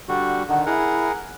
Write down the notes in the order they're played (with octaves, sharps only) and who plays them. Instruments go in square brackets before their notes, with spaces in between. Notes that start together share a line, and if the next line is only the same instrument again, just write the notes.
[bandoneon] D3 G3 F#4
[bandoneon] D3 D#3 [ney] F#5
[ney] E4 [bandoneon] G#4 A#4 F#5